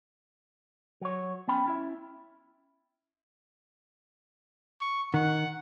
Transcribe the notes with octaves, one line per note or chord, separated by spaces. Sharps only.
F#3 C#5
B3 C#4 G5 B5
C#4 E4 E5
C#6
D#3 F#5